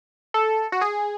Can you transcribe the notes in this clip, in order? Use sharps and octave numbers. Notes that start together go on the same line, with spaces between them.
A4
F#4
G#4